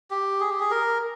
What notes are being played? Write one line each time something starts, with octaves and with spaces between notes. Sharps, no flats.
G4
G#4
G4
G#4
A#4